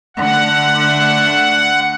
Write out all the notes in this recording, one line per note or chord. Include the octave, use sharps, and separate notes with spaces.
D3 A3 F#5